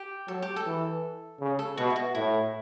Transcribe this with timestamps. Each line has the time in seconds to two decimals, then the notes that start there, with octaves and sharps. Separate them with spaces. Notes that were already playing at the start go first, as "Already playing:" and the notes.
Already playing: G4
0.28 F#3 A4
0.42 G4
0.56 A4
0.66 E3
1.40 C#3
1.59 A4
1.77 B2 F#4
1.90 E4
1.96 F#4
2.15 A2 E4